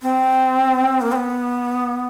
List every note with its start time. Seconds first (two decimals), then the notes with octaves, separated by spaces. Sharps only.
0.02 C4
1.01 A#3
1.12 C4
1.16 B3